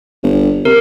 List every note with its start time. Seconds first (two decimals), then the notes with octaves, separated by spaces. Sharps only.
0.23 G1
0.65 C3 A#4